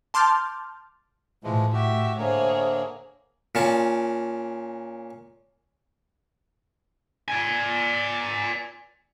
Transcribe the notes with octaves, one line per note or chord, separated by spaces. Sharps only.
A5 C6 D6 F6 G6 A6
A2 E3 F3 G#3
F#4 G4 E5
D3 A#3 G#4 C5 C#5 E5
A#2 C#4 A5
D5 G#5